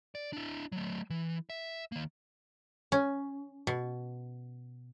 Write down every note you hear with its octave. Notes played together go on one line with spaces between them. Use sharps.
D5
D4 E4
F#3 A3
E3
E5
D#3 A#3
C#4
B2